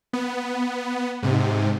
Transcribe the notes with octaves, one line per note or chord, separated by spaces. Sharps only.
B3
G#2 C3